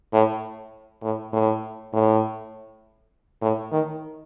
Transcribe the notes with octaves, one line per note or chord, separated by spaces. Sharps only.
A2
A2
A2
A2
A2
D#3